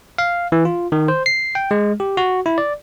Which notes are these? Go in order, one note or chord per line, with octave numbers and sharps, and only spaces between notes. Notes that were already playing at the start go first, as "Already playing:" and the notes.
F5
E3
F4
D#3
C5
C7
G5
G#3
G4
F#4
E4
D5